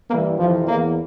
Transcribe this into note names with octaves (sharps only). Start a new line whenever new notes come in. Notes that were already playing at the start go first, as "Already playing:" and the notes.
G2 E3 A#3
F2 C3 E3 F3
E2 E3 A#3